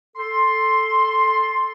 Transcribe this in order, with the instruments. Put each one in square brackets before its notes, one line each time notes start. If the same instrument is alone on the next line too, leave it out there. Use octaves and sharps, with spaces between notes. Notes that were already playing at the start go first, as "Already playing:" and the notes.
[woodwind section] A4 C6